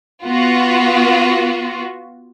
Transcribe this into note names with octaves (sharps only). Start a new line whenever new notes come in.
B3 F4 F#4